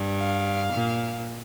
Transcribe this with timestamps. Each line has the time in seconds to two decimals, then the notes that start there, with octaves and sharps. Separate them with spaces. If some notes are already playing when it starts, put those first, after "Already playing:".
Already playing: G2
0.19 F5
0.73 A#2